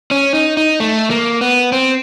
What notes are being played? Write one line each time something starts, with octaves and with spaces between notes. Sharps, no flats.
C#4
D#4
D#4
A3
A#3
B3
C4